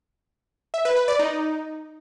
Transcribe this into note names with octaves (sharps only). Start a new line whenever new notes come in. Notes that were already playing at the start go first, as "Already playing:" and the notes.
E5
B4
B4
D5
D#4